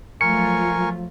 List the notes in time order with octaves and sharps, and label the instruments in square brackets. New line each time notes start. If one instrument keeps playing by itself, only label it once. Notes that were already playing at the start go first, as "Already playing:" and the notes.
[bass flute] F3 [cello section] F#3 A3 F4 [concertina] A#4 G#5 C#6 [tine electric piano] C#7